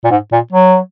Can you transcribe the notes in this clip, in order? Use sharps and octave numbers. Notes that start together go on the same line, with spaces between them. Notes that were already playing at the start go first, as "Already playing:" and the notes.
A#2
G#2
A#2
F#3